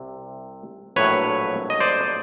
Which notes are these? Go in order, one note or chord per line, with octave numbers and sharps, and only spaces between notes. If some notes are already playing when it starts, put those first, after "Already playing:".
Already playing: C2 C3
A#1 A2 F#3 B4 C#5
D#5
C5 D5